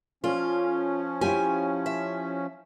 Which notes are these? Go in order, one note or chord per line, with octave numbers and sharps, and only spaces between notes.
F3 C#4 F4 A4 D5
E4 F4 G4 G#5
E5